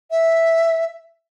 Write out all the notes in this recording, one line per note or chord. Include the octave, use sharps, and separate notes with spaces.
E5